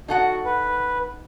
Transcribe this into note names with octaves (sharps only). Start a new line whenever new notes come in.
D#4 F#4 A4 F#5
B4